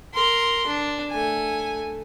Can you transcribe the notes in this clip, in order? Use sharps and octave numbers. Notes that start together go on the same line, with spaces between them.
A#4 C6
D4
A3 G#5